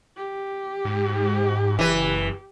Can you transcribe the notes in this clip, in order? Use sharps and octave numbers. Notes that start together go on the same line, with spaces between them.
G4
G#2
F#1 E3 B4